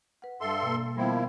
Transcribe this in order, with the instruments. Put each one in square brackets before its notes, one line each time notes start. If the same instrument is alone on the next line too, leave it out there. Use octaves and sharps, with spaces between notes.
[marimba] B4 F#5
[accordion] G2 A4 C6 [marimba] E5
[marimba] B2 A#3
[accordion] D#3 F3 E4 [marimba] G3 B3